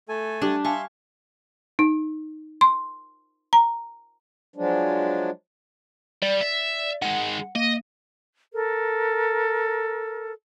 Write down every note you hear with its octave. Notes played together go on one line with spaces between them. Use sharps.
A3 A4 G#5
G3 D4 G4
E5 F5 G#5 A5 C6 C#6
D#4
C6
A#5
F3 F#3 G#3 D4
G3 D5
E5
D#3 G#3 F#5
A#3 D#5
A4 A#4